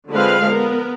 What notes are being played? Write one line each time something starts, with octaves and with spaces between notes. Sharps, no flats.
D3 F3 G#3 C4 B4 F5
B3 A#4